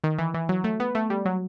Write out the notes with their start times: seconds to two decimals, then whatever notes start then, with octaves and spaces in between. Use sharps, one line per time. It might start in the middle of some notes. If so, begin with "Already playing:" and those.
0.04 D#3
0.19 E3
0.34 E3
0.49 F#3
0.64 A3
0.80 B3
0.95 A3
1.10 G3
1.25 F#3